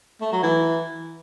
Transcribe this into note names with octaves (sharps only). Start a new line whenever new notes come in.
A3
F#3
E3